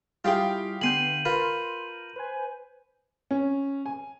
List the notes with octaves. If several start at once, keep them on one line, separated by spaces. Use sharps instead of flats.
G3 E4 F4 G4 G#4 F5 G5
D3 B3 G#5 C6 G6 D#7 F#7
F4 A#4 B4 C6
B4 C5 G#5
C#4
G#5